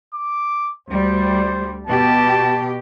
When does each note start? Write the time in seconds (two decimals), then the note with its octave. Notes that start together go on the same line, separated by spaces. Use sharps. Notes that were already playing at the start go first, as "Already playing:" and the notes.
0.13 D6
0.89 D2 G3 C5
1.87 B2 G4 A5